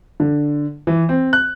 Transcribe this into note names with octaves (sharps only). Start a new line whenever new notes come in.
D3
E3
C4
F#6